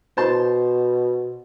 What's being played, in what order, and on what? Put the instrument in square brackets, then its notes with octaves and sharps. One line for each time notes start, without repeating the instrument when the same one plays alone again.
[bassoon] B2 [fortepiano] C5 A5 C6